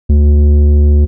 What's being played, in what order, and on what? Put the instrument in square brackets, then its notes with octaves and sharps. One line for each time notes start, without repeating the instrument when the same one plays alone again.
[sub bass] D2